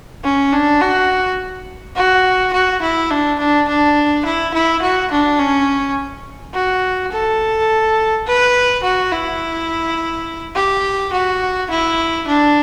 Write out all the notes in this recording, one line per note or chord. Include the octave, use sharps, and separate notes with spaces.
C#4
D4
F#4
F#4
F#4
E4
D4
D4
D4
E4
E4
F#4
D4
C#4
F#4
A4
B4
F#4
E4
G4
F#4
E4
D4